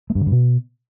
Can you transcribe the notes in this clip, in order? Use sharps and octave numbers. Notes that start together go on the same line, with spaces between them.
A3
G2
D3
G2
B2